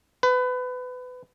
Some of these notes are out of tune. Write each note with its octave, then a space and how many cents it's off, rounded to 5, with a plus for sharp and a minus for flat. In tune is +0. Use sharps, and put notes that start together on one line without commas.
B4 +25